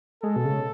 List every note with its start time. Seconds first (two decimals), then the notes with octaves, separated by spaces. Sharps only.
0.23 G#3 A4
0.36 B2
0.45 C#3